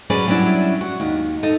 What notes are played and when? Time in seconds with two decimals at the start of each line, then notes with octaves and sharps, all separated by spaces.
0.10 F#3 C#4 G#4 B4 D5
0.28 F#3 G3 C#4 D4 E4
0.81 F#4
1.00 D#2
1.43 D#4 A4